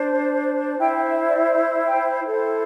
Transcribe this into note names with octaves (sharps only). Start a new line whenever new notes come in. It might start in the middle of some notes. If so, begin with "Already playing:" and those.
Already playing: D4 C5
E4 C5 G5
G5
E5
D5
E5
G5
E4 A4 C5